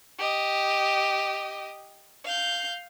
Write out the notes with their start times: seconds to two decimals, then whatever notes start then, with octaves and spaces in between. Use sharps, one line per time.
0.19 G4 D#5
2.25 F5 G6